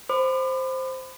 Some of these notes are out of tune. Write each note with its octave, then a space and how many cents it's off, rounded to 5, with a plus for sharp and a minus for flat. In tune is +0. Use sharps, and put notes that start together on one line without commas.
C5 +0 B5 +30 D6 +40